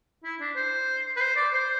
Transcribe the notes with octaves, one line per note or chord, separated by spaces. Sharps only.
E4
D4
C5
B4
C5
D5
C5